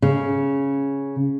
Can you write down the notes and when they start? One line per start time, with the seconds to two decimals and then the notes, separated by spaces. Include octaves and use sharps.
0.02 C#3